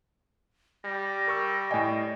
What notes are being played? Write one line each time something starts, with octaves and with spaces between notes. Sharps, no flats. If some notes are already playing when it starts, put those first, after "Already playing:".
G3 A#6
A#4 C#6 E6
A2 D5 D#5 G5 G#5